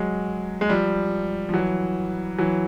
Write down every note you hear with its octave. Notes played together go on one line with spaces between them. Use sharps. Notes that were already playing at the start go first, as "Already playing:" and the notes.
Already playing: F#3 G#3
G#3
F3 G3
F3
E3 F#3
E3 F#3